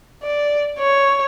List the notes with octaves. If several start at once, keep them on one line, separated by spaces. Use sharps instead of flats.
D5
C#5